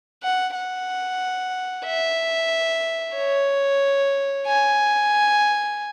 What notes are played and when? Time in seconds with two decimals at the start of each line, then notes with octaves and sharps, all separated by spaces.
0.23 F#5
0.55 F#5
1.85 E5
3.16 C#5
4.47 G#5